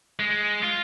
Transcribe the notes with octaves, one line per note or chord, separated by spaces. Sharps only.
G#3
F4